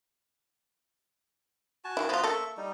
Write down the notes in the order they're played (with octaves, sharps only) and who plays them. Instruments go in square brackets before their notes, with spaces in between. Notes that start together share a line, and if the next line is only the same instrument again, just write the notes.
[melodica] F#4 G#5 A5
[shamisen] D#3 E4
[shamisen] F3 F4 [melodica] B3 F#4 D#6
[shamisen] A#3 A4 [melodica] E5 C#6
[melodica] G3 D#4